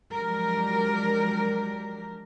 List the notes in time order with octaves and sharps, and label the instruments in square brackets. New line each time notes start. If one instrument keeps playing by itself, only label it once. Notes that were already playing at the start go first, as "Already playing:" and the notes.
[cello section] F3 F#3 G#3 D4 G4 A#4